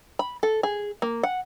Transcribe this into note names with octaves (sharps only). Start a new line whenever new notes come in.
B5
A4
G#4
A#3
F#5